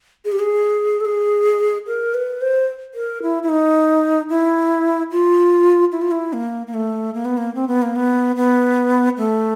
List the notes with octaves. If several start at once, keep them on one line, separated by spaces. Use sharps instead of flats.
G#4
G4
G#4
A4
G#4
A#4
B4
C5
A#4
E4
E4
D#4
E4
F4
E4
F4
E4
A#3
A#3
A3
A#3
B3
A#3
C4
B3
A#3
B3
B3
A3